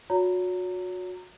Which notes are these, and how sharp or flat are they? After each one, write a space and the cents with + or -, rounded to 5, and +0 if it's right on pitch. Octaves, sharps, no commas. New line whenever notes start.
F#4 -30 C#5 +30 A#5 -20